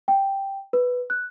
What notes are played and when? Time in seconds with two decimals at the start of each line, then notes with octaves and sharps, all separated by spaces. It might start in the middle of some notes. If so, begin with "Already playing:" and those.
0.08 G5
0.73 B4
1.10 F#6